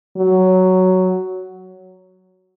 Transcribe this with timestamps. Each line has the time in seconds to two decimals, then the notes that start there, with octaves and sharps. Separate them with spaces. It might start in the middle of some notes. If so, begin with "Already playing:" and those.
0.17 F#3